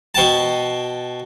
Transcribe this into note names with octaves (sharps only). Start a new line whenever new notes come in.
B2 G5 A5